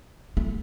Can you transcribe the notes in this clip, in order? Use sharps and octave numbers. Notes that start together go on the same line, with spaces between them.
A3